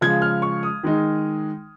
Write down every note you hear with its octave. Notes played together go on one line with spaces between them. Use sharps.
C#3 F3 G#3 G#6
F6
C#6
D#6
D#3 G#3 D#4